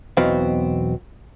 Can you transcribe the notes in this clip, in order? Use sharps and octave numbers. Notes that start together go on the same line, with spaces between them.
B1 E2 B2 B3 C4 F5